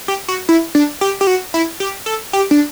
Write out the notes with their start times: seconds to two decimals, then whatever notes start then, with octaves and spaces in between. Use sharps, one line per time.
0.08 G4
0.28 F#4
0.49 E4
0.75 D4
1.01 G4
1.21 G4
1.27 F#4
1.54 E4
1.80 G4
2.06 A4
2.33 G4
2.51 D4